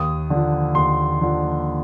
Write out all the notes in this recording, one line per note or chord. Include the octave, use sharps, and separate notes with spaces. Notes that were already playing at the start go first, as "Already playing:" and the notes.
Already playing: D#2 D#6
D3 F3
D#2 C6
D3 F3